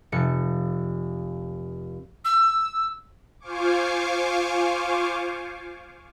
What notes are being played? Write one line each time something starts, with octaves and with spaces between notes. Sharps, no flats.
F1 C#7
E6
F4 C5 F5 G#5 C#6 D6